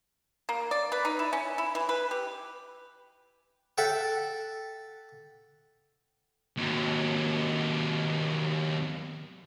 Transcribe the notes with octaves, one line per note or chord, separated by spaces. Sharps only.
A#3
D5
B4
D#4
E4
C#4
E4
E3
B4
G4
A4 E5 F#5 G5
D#2 F#3